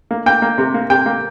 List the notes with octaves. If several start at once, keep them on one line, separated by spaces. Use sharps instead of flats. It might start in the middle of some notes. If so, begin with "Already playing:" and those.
A#3
A#3 G5
A#3
C3
A#3
C3 G5
A#3